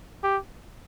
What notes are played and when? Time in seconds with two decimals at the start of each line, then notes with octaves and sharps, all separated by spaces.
0.24 G4